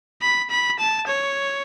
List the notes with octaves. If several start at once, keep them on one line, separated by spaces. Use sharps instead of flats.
B5
B5
A5
C#5